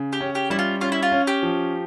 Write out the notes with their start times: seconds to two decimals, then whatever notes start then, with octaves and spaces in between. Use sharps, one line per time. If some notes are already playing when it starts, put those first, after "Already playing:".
Already playing: C#3
0.13 G4
0.21 C#4
0.35 G4
0.50 G3 E4
0.59 F4
0.81 C#4 F4
0.92 E4
1.03 F4
1.12 C#4
1.27 G4
1.43 F3